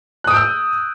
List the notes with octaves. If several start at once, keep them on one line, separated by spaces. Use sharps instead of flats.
D#6 E6 F#6 G6 D7